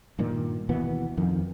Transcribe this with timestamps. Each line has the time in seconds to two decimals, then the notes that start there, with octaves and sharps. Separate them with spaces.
0.19 G2 A#2 D#3
0.69 D#2 B2 E3 B3
1.17 F2 D#3